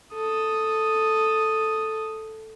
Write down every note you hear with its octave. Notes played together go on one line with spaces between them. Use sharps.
A4 D#6